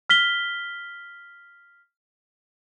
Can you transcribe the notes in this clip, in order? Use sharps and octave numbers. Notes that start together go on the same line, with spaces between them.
F6 B6 G7